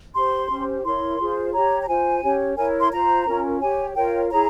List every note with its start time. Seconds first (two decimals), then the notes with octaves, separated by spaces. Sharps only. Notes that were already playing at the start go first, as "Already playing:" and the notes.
0.15 G4 C5 C6
0.49 C#4 G4 C5
0.84 E4 A#4 C#5 C6
1.19 F4 G#4 C5
1.53 G4 C#5 A#5
1.82 A#5
1.87 F4 C5 G#5
2.22 C#4 G4 C#5
2.57 E4 A#4 C#5 G#5
2.80 C6
2.92 F4 C5 A#5
3.26 C#4 F4 A#4
3.61 G4 C#5 G#5
3.95 F4 A#4 C#5 G5
4.30 E4 G#4 C#5 A#5